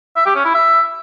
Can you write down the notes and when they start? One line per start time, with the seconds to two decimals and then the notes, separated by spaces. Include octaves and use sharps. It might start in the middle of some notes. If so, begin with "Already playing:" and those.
0.17 E5
0.26 G4
0.35 C#4
0.45 E4
0.54 E5